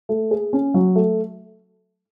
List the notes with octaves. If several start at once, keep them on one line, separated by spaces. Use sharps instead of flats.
A3
G#4
C#4
F#3
A3